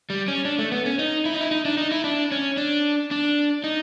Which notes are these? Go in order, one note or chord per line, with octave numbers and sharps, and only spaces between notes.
G3
C#4
D4
A3
B3
C#4
D#4
E4
D#4
E4
D#4
D4
D#4
E4
D4
C#4
D4
D4
D#4